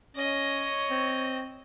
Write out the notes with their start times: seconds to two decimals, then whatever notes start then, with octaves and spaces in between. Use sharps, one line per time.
0.16 C#4 C#5 D#5
0.90 C4